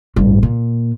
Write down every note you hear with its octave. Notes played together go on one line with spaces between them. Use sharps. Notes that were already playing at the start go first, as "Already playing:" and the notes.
A1 G2
A#2